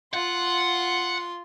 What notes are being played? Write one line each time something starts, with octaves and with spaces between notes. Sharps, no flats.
F4 F#5 C6